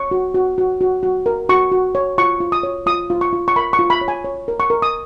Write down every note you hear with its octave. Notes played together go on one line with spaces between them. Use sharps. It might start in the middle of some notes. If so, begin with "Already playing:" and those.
Already playing: C#5 C#6
F#4
F#4
F#4
F#4
F#4
A#4
F#4 C#6
F#4
C#5
F4 C#6
F4
D#6
C#5
F4 D#6
F4
C#6
F4
C#6
A#4 B5
C#6
F4
B5
C#5
G#5
C#5
A#4
C#6
A#4
D#6